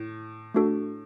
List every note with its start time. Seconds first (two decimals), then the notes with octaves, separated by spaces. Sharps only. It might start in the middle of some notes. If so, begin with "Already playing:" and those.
Already playing: A2
0.54 A3 D4 F#4 A4